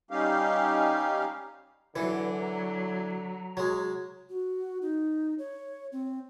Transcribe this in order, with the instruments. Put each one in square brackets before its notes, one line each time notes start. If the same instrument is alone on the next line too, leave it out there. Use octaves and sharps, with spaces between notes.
[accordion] G3 C#4 D#4 G4 F5
[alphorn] D3 [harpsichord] E3 [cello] F#3 [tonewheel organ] B4
[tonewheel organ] A#5
[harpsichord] F#3 G#3
[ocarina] F#4
D#4
C#5
C4